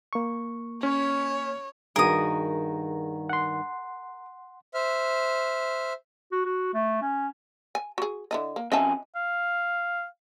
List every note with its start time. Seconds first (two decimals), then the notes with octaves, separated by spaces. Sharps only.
0.13 A#3 C#6
0.83 C#4 C#5
1.96 G2 D#3 F#4 G#4 A#4 D#6
3.29 F#5 C6
4.74 C5 E5 F6
6.32 F#4
6.45 F#4
6.74 A3
7.02 C#4
7.75 G#5
7.98 F#4 G#4
8.31 D3 E4 D#5
8.56 A#3
8.72 F2 C#4 D#5 E5 G#5 A5
9.16 F5